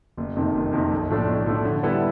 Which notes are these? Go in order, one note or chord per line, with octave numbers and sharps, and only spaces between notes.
F#1
F2 C3 D#3
F#1
F2 C3 D#3
B1
A2 F3 A3 D4
B1
A2 F3 A3 D4
D3
G3 B3 E4 A4